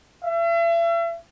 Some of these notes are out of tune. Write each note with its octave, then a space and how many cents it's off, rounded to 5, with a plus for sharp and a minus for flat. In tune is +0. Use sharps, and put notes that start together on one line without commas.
E5 +40